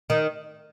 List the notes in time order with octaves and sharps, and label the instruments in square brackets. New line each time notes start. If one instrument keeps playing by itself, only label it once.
[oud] D#3